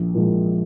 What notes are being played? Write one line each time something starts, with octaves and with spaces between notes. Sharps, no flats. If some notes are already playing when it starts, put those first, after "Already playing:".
Already playing: A#1
A#2 F3 G#3